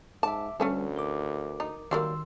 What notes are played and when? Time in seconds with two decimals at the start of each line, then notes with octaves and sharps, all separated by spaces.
0.23 G#2 E5 A5 D6
0.60 D2 G3 A3 C#4 A4 B4
0.97 A#4 D6
1.60 D#4
1.91 D#3 F#3 G3 A#3 C6 E6